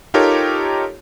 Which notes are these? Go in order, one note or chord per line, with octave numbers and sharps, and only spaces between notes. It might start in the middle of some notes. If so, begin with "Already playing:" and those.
D#4 F4 G4 A4 A#4 C#5